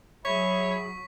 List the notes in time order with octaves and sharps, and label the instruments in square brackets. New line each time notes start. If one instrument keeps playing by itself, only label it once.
[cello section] F#3 [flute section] G#4 E5 B5 [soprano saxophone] C#5 [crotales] C#6 B6